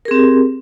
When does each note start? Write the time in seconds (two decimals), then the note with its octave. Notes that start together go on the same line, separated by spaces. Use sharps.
0.05 A#4
0.08 G#4
0.11 C4
0.14 G4